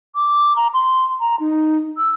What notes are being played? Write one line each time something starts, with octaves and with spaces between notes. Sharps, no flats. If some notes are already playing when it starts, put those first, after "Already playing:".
D6
A#5
C6
A#5
D#4
E6